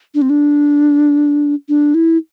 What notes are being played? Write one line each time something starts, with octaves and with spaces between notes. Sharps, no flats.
D4
C4
D4
D4
E4